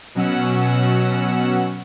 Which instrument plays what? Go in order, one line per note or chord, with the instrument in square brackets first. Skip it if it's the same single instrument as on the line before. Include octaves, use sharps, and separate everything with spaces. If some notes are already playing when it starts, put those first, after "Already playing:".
[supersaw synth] B2 F#3 C#4 F#5 E6